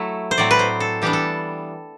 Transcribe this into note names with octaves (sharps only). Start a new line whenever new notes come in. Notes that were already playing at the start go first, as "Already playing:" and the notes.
Already playing: F#3 A3 E4 E5
C5
A2 F#3 C4 D5
B4
C5
A4
E3 G3 B3 D4 G4
A4